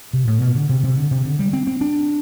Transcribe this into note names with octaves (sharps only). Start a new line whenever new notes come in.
C3
A2
B2
D3
C3
C3
D3
C3
D3
G3
C4
C4
D4